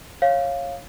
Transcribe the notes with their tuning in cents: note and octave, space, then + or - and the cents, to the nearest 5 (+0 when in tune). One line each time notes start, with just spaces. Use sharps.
C#5 -15 F5 +0